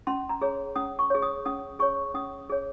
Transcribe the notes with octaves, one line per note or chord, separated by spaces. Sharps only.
C#4 C6
A#5
G#4 C#5
C#4 D#6
C#6
G#4 C#5
D#6
C#4 D#6
G#4 C#5 C#6
C#4 D#6
G#4 C#5